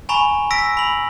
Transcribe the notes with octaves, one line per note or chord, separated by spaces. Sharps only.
G#5 A#5 B5 C#6
E6 A#6 B6 D7
B5 F#7